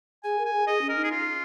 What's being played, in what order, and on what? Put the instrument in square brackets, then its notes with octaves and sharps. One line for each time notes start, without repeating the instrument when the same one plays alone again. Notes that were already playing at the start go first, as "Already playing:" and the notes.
[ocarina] G#4 [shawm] G#5
[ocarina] A#4
[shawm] G#5
[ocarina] G#4
[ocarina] G#4 [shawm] D#5
[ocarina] C#4
[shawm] A#4
[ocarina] D#4
[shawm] G#4
F4